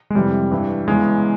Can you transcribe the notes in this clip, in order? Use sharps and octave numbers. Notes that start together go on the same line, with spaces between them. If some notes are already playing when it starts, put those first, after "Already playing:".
G#3
F2 C3 E3 G3
G2 E3
E2 C#3 E3 G#3